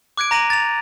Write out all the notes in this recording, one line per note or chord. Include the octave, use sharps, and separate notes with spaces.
D6 F#6 G#6 D7
A#5 A#6 D#7 E7 F#7
A6 F7